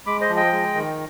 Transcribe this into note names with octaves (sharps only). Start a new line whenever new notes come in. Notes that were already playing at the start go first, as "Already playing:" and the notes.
G#3 B5 D6
C5 D#5
F3
D#5 G5
G#3
D#3